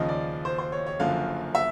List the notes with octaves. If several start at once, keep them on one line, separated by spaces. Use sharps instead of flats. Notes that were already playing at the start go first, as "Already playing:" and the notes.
Already playing: D#2 C#3 F3 D#5
D5
C5
C5
C#5
C#5
F#1 F#2 D3 F3 F5
E5